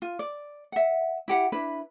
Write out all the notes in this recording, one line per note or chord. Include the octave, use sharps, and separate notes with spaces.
F4
D5
E5 F#5
E4 G4 F#5
D4 E4 B4